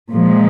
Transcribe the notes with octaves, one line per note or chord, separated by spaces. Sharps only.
A#2 F3 G#3